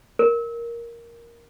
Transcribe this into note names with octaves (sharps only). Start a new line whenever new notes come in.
A#4